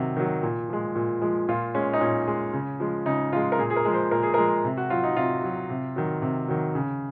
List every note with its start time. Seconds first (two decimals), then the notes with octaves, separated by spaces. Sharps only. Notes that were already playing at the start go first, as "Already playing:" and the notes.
Already playing: C3 D#3 F#3
0.17 D#3 F#3
0.43 A#2
0.69 F3 G#3
0.95 A#2
1.21 F3 G#3
1.48 A#2 F4
1.75 G#3 C#4
1.93 D#4
2.01 A#2 C#4
2.28 G#3
2.53 C#3
2.80 F3 G#3
3.06 C#3 D#4
3.32 F3 G#3 F4
3.52 A#4
3.59 A#2 G#4
3.70 G#4
3.76 A#4
3.85 F3 G#3
3.94 C5
4.11 A#2 A#4
4.23 G#4
4.34 F3 G#3 A#4
4.65 C3
4.77 F#4
4.90 F#3 F4
5.04 D#4
5.16 C3 F4
5.43 F#3
5.70 C3
5.96 D#3 F#3
6.22 C3
6.48 D#3 F#3
6.75 C#3